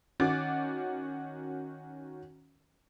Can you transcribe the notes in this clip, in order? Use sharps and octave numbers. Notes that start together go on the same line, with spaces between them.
D#3 C#4 F#4 D6 A6